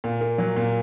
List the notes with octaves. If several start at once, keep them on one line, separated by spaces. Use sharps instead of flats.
A#2
A#3
F#3
A#2